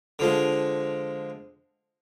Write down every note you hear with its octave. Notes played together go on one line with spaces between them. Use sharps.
D3 F3 G#3